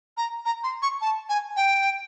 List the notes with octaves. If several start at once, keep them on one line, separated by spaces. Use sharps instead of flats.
A#5
A#5
C6
C#6
A5
G#5
G5